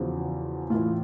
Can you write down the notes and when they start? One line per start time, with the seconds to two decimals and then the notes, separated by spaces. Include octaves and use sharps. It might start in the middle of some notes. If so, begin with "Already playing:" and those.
Already playing: E2 C#3 F3 F#4
0.70 A2 E3 F4